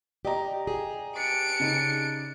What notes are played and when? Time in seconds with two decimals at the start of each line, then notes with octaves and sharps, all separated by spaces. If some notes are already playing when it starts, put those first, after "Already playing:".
0.25 G4 D5 D#5 A#5
0.67 G4 G#4
1.17 D4 C#7 D7
1.60 C#3 C#4 D#4